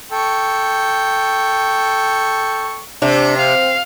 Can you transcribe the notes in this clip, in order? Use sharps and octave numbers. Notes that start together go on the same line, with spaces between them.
A4 G5 C#6
C3 D4
C4 F5